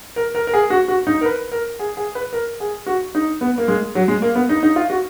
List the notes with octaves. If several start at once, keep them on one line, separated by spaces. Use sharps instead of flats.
A#4
A#4
A#4
G#4
F#4
F#4
D#4
A#4
B4
A#4
G#4
G#4
B4
A#4
G#4
F#4
D#4
B3
A#3
G#3
F#3
G#3
A#3
B3
D#4
D#4
F4
F#4